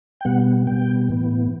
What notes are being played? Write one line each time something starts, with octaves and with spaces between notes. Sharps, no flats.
G5
B2 G3 B3 F#5
B2 G3 B3 G5
A2 E3 B3